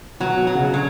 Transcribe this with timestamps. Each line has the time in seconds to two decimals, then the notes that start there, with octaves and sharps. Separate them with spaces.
0.20 B2 F#3
0.38 B2
0.47 F#3
0.55 C#3
0.74 D3 F#3